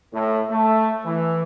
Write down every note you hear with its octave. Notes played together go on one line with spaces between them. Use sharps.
A2
A3
E3